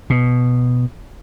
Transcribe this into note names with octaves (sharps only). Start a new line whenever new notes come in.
B2